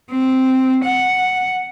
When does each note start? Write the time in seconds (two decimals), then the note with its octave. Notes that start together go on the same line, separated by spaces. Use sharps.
0.11 C4
0.84 F#5